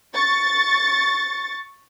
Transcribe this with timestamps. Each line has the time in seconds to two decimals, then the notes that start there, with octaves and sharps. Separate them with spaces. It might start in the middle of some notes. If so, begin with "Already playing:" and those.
0.14 C#6 A6